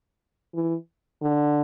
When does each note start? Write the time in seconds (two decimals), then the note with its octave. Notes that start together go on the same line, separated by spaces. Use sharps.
0.54 E3
1.22 D3